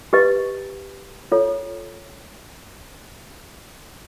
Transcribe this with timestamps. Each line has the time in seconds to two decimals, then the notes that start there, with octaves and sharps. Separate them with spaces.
0.13 G4 B4 D#5
1.32 F4 A4 C#5